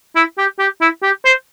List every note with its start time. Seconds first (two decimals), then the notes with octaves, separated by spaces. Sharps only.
0.16 E4
0.38 G4
0.59 G4
0.81 E4
1.03 G4
1.25 C5